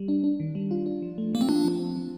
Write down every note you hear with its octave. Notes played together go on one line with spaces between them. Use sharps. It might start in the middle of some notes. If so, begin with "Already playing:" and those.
Already playing: G3
D4
D4
D#3
G3
F4
D4
F3
A3
F3 A#3
C4
D4 F4
F3
C4
F3